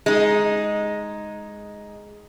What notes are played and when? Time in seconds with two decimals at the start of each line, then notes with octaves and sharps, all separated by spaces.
0.06 G#3 D#4